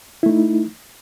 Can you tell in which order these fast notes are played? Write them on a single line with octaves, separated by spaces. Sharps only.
E4 A3 D#4